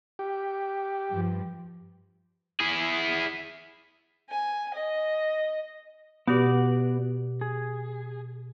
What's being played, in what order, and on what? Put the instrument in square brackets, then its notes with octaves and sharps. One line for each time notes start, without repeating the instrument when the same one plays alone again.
[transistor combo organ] G4
[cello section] G2 F3
[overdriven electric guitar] E4 G#4
[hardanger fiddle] G#5
D#5
[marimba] B2 G4 [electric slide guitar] B3 F#4 D5
[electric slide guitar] G#4